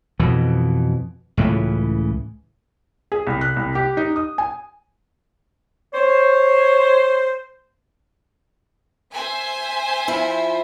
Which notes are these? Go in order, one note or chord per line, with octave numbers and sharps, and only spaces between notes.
F2 B2 E3
C#2 A2 C#3 E3
G#4
C2
F#6
C2
G4
D#4
D#6
G#5
C5 C#5
C5 E5 G#5
F3 E4